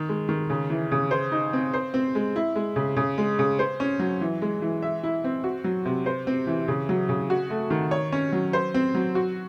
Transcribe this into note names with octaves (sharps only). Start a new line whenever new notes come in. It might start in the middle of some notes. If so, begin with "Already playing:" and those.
Already playing: D#3
G#3
D#3
C#3
E3
C#3
C5
D#4
C4
C5
C4
G#3
E4
G#3
C#3
C#3
G#3
C#3
C5
C#4
F#3
E3
G#3
E3
E5
E4
C4
F#4
F#3
C3
C5
C4
E3
C#3
F#3
C#3
F#4
A3
D#3
C#5
C#4
F#3
C5
C4
F#3
F#4